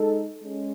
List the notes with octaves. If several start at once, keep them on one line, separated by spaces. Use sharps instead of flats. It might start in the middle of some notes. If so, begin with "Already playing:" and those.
Already playing: G#3 D#4 A4
G#3 C#4